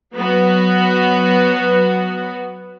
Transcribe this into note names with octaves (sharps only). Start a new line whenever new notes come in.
F#3 B3 F#4